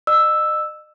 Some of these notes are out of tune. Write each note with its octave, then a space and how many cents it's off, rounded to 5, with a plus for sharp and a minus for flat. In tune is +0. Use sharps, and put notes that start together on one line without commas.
D#5 -35 E6 +0